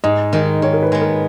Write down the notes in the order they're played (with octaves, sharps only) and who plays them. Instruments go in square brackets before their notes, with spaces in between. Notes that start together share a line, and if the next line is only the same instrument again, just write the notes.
[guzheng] G#2 [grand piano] D#5
[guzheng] D#3 G#3 D#4 [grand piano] D#5
[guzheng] D#3 [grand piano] C#5
[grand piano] A#4
B4
[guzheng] G#3 B3
[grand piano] A#4